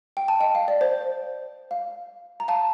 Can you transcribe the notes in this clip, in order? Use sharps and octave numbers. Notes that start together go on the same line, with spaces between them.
G5
A5
D#5 G5
F5
D5
C5
F5
A#5
F5 A5